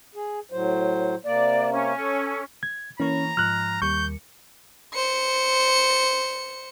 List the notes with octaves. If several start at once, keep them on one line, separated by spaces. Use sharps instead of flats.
G#4
A2 F#3 C5
C3 A#3 D5
C#4
A4
G#6
E3 A#3 C#4 C#5 A#5
G#2 F3 F6 F#6
D#2 G3 C#6 G6 C#7
C5 C#7